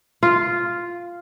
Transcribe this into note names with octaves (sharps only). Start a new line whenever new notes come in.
F4